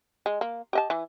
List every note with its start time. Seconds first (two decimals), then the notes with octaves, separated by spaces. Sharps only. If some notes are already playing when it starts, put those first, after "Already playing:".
0.26 G#3
0.41 A#3
0.73 G4 D#5 A5
0.90 E3